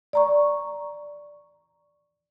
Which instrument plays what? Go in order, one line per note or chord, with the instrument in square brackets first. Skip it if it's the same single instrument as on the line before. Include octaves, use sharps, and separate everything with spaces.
[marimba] D5 A#5 C#6